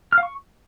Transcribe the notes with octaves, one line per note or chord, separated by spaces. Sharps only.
F6
F5
C#6